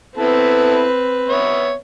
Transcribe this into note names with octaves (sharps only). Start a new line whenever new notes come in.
B3 C4 E4 A4 B4
B3 C#5 E5